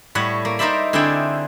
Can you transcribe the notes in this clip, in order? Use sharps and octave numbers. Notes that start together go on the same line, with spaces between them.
A2 G3 C#5 F#5
A#3
D#4 A#4 C5 D5 E5 B5
D3 C4 E4 G#4 D5 G5